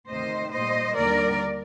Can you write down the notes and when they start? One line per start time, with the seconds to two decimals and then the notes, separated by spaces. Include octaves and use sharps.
0.09 D2 C3 D#3 C5 D#5
0.53 A#2 G3 C5 D#5
0.96 D#2 D3 G3 A#4 D5